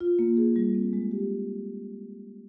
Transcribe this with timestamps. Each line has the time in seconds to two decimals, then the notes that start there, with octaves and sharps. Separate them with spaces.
0.01 F4
0.19 A#3
0.37 G#4
0.56 G3
0.75 C4
0.93 G#3
1.11 G4